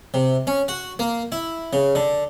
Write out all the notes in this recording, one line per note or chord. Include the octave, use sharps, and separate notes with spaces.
C3
C#4
F#4
A#3
E4
C#3
D3